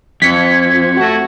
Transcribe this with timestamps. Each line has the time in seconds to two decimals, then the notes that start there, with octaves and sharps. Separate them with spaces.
0.22 F2 G#6 B6 C#7
0.97 A3 F#4